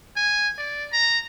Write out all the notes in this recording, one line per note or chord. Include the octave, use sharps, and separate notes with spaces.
G#5
D5
A#5